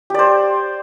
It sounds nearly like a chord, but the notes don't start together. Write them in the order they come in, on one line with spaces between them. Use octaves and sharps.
G4 D5 C5